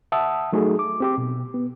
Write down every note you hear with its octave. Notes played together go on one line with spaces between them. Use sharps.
E5 F#5 A5 D#6 E6
F#3 A3 D#4 F#4 G#4 A4
D6
C4 G4 D6
B2
B3